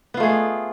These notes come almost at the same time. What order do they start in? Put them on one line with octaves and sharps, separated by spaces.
B3 F4 A3 G#4